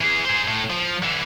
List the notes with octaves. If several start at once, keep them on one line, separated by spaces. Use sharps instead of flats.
E3 G#4
G#4 C5
A2
F3
D3 E3